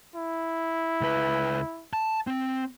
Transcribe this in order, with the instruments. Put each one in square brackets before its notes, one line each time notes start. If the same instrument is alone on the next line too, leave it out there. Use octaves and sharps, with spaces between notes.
[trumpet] E4
[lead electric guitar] C#2 B4
A5
C4